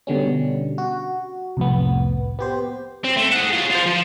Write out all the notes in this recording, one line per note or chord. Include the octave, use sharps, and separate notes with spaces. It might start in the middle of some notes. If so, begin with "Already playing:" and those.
B2 D3 G3 C#4
F#4
C2 F2 A2 B3
B3 G4 C5
C4
A3
G#4 F#5
F4 G#4
F4 C5
F3